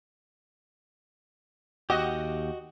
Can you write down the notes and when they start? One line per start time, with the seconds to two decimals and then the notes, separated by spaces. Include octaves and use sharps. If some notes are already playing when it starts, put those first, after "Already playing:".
1.90 D#2 F#4 G4 D#5